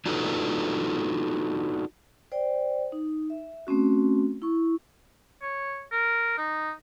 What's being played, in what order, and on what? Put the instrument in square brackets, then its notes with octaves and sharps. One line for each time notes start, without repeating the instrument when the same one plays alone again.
[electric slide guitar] D4 D#4 F4 F#4 A4 B4
[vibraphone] C5 D5 G5
D#4
E5
A3 C4 C#4 F#4
E4 C#6
[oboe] C#5
A#4
D#4